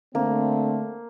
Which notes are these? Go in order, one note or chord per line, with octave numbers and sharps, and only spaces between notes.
D3 A3 A#3 C4